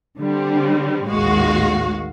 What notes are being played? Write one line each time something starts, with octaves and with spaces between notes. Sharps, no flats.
D3 G3 C4
A1 D#2 A2 G#3 F#4 F5